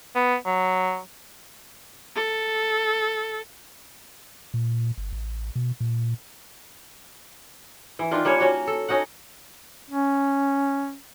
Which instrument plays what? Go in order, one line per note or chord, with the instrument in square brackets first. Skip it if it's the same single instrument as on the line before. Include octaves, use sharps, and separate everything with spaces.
[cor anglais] B3
F#3
[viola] A4
[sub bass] A#2
G1
A1
B2
A#2
[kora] E3
D#3 D4 F4
G3 A#3 C#4 C#5
C#4 F#4
A4
C#4 D#4 F#4 F#5
[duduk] C#4